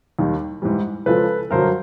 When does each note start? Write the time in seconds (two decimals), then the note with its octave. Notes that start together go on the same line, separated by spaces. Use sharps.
0.19 D#2 D#3 G3
0.62 G#2 E3 G3
1.06 C#2 C#3 F3 A4 B4
1.51 G2 D3 F#3 A#4 C5